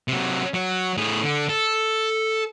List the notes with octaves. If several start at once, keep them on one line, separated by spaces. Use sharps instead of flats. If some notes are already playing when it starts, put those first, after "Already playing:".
C3 F#3
F#3
A2 G#4
D3
A4